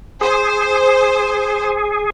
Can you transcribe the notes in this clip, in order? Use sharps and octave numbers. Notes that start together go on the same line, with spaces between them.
G#4 C5